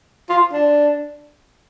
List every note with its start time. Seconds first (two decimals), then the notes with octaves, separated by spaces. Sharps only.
0.29 F4
0.53 D4